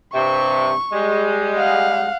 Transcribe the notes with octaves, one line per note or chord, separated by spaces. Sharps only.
G2 C3 C#6
G3 G#3
F5 F#5